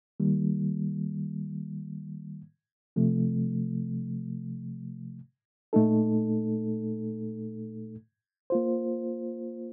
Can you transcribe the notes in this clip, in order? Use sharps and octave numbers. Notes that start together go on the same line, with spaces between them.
D#3 G3 A#3
C3 F3 A3
A#2 A3 D#4 A4
A#3 F4 C5